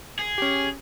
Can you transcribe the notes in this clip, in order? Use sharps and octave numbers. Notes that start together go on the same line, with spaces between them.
G#4
C#4 G4